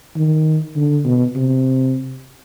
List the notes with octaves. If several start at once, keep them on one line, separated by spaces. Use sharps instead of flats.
D#3
D3
B2
C3